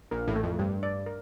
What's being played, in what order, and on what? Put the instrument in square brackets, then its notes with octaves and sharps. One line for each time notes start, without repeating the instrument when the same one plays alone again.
[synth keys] A#1 A#2 [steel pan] A#4
[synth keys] A1 A2
[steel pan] A3
[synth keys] F2
[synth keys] G2 [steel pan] G3
[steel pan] D5
A#4